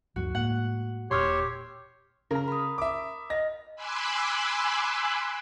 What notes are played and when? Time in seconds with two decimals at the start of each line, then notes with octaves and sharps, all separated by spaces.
0.16 D2 G2 F3 F#4
0.35 A2 G#3 A#3 F#5
1.11 E1 A#2 G4 C#5 C6 E6 F6
2.31 C#3 A#4 A#5
2.48 B5 D#6
2.78 E5 D6
3.30 D#5 F5 A#6
3.76 G#5 B5 C6 D6 E6 F#6